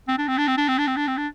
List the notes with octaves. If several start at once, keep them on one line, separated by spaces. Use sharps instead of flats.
C4
D4
C4
D4
C4
D4
C4
D4
C4
D4
C4
D4